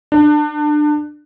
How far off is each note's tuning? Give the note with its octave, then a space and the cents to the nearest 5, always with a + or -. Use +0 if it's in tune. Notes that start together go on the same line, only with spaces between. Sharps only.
D4 +25